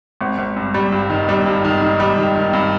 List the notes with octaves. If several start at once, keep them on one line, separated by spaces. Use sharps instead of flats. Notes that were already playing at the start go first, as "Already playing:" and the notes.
G#1
G#1
G2
G3
G2
D#3
G3
G2
D#3
D#3
G3
D#3
D#3
G2